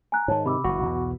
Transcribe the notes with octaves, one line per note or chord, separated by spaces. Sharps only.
G#5 A#5 F#6
G#2 D#3 C#5 A5
C3 B5 D6 E6
F#1 E3 F#4
B1 E2 B2